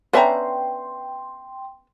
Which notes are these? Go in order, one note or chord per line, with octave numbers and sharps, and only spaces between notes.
B3 C#4 D4 B4 E5 G5 A#5 C6